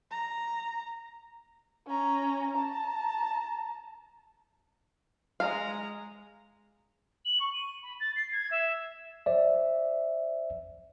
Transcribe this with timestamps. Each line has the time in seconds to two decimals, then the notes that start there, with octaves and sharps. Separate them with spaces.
0.11 A#5
1.87 C#4 A#5
2.53 A5 A#5
5.40 G#3 F5 A#5
7.24 F#7
7.39 C#6
7.53 D#7
7.82 B5
8.00 A6
8.16 C7
8.32 G#6
8.50 E5
9.26 C5 D5 E5